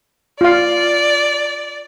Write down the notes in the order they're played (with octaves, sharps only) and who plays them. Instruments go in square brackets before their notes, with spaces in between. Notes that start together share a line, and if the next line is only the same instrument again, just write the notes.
[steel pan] F4 F5 [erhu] D5